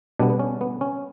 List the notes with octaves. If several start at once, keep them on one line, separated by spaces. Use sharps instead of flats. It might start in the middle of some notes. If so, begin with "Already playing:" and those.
B2 G3 B3 D4
B3
C#4
B3
C#4